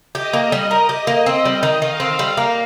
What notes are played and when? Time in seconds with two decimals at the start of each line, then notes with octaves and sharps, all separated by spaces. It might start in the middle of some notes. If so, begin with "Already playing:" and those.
0.15 G4 D#5
0.33 A#3
0.52 G3
0.71 A#4
0.89 G4
1.07 A#3
1.26 C4
1.45 G3
1.63 D#3
1.82 D#3 F5
2.00 C4
2.19 G3
2.37 A#3